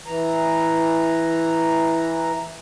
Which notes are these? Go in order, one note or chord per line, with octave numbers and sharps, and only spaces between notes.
E3 A#5